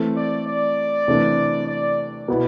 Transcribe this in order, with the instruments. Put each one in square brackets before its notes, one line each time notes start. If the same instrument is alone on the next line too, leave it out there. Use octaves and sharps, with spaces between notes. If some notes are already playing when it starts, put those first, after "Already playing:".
Already playing: [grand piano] E3 A3 C4
[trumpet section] D5
D5
[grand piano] C3 E3 A3 D4 A4
[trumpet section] D5
[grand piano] B2 B3 E4